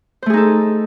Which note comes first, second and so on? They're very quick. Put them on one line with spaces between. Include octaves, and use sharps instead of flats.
C5 A3 G#4 D#4 A4